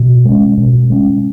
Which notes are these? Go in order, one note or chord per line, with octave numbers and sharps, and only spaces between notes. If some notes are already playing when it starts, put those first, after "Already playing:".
Already playing: B2
G#3 C#4
B2
G#3 C#4